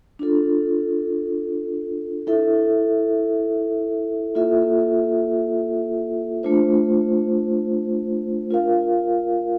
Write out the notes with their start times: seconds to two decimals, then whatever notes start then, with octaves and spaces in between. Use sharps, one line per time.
0.19 D4 F4 A4
2.27 E4 A4 E5
4.35 A#3 F4 A4 E5
6.43 A3 D4 F4 C5
8.51 F4 A#4 F5